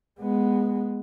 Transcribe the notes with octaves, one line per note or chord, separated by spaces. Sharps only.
G#3 B3